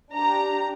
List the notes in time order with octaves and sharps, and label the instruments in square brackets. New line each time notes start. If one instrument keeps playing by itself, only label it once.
[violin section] D4 G4 A#5